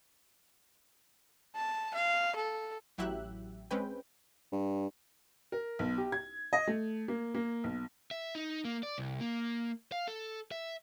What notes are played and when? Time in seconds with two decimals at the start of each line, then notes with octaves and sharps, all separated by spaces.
1.56 A5
1.94 F5
2.36 A4
2.98 A1 F#3 E4 G4 E5 F#6
3.71 G#3 C4 C#4 B4 G5
4.52 G2
5.52 A#4
5.79 B1
5.97 G4
6.12 G#6
6.53 D#5
6.67 A3
7.08 A#3
7.35 A#3
7.64 B1
8.11 E5
8.35 D#4
8.65 A#3
8.83 D5
8.98 C2
9.21 A#3
9.92 F5
10.08 A4
10.52 E5